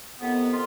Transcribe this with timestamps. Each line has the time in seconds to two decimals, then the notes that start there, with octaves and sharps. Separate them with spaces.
0.20 F2 C3 D#3 B3
0.51 F4